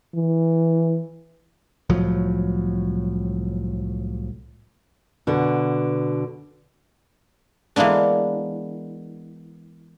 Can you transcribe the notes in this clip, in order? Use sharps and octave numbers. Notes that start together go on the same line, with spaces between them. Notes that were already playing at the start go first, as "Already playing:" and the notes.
E3
C2 A2 F3 F#3
B2 D3 B3
E3 G#3 A#3 B3 D4